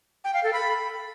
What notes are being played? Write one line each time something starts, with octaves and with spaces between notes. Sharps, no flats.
G5
F5
A4
B5